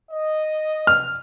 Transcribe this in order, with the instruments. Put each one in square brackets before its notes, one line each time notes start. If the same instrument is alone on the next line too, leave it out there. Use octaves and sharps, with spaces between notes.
[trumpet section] D#5
[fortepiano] F6